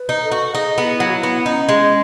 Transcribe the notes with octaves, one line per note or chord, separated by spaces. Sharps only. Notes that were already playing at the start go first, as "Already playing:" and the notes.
Already playing: B4
D#4
A4
F#4
D#4 G#4
B3
E4
F#3
F#4
E4
B3
C#4 D#4
G#3